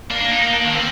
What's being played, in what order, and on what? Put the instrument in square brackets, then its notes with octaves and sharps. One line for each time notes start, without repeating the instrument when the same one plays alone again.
[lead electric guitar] A#3 [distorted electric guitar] D4
[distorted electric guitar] D4
D#4
D#4
D4
D#3
[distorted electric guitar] D3 [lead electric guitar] C4